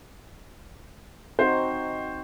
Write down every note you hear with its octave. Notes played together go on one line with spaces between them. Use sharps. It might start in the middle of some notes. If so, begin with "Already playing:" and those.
C4 D#4 F#4 C5